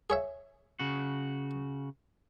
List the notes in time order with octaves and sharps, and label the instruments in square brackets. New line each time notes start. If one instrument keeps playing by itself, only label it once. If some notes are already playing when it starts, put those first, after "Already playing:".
[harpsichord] G#4 C#5 E5
[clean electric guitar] C#3 F#4